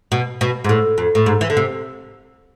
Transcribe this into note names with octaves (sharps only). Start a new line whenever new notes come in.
B2
B2
G#2
A2
F2
A2
G#2
E3
D3
C3